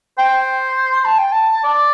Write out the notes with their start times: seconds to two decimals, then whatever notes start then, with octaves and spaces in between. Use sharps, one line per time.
0.17 C5 G5
0.91 C6
1.04 A5
1.18 G5
1.31 A5
1.65 D5